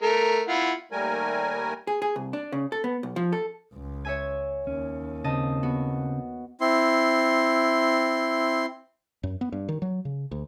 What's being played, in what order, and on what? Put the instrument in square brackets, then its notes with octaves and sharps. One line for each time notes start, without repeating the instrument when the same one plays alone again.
[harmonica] A3 A#4
E4 F4 F#5
[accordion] D#2 G3 A3 A#4 G#5
[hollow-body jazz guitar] G#4
G#4
C2
D4
C#3
A4
B3
B1
F3
A4
[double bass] C#2
[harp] C#5 E5 G#5
[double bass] D#2 [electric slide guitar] C#4
[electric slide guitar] C#3 C4 [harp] D#5 A5
[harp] B3 F#4
[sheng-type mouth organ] C4 E4 C6
[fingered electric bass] F#2
B3
G2
D#3
F#3
C#3
D2